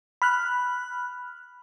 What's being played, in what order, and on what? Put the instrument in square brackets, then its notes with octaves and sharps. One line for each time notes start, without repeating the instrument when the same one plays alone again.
[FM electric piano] B5 F6 F#6